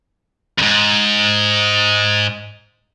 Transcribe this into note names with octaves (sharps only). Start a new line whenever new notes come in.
E2 G#2